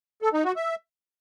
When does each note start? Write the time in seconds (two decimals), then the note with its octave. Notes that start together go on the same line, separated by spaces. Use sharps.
0.22 A4
0.33 D#4
0.45 F#4
0.56 E5